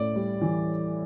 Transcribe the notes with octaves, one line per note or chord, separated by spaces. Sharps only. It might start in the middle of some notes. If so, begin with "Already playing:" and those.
Already playing: A2 C#4 D5
G3
E3